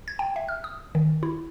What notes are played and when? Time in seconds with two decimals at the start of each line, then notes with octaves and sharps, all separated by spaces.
0.08 G#6
0.19 G5
0.36 E5
0.49 F6
0.64 D#6
0.95 D#3
1.23 E4